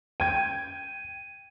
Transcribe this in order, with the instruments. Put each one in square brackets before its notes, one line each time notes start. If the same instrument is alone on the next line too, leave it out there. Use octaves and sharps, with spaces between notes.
[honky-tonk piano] G5 G#6 [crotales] D#7